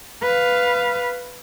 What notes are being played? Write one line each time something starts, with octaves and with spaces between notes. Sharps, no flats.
B4 F5